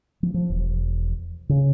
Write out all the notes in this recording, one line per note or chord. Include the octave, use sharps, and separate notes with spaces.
F3
F3
E1
C#3